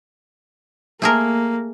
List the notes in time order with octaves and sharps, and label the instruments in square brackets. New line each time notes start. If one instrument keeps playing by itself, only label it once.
[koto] A3 G#4 A#4 [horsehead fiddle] A#3